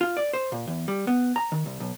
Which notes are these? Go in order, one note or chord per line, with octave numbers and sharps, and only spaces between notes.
F4
D5
C5
A#2
E2
G3
B3
A#5
D#3
C2
B1